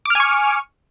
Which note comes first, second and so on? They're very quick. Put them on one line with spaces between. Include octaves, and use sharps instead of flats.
D6 F6 G#5 C#6